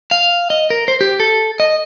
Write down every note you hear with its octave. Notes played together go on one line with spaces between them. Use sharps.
F5
D#5
A#4
C5
G4
A4
D#5